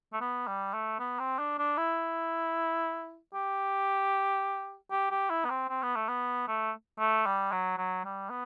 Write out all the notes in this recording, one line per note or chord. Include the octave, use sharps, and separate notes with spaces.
A3
B3
G3
A3
B3
C4
D4
D4
E4
G4
G4
G4
E4
B3
C4
C4
B3
A3
B3
A3
A3
G3
F#3
F#3
G3
B3